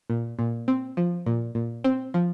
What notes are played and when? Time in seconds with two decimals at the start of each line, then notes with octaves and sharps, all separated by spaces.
0.10 A#2
0.39 A#2
0.68 C4
0.97 F3
1.26 A#2
1.55 A#2
1.84 C4
2.14 F3